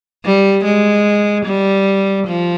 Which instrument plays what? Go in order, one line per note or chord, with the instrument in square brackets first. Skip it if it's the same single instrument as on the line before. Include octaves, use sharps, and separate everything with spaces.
[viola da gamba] G3
G#3
G3
F3